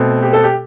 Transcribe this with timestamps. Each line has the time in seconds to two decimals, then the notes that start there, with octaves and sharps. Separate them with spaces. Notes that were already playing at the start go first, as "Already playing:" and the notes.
Already playing: B2 A3 C4
0.23 G4
0.33 A4
0.44 G4